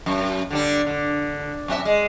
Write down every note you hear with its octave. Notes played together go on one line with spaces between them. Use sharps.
F#2
D3 G3 D4
D3
F#2 C4 E5
G#3